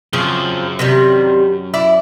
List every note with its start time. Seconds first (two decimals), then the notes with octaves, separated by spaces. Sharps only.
0.13 F#2 C#3 F3 C4
0.79 C3 D#3 G3
1.74 E4 D5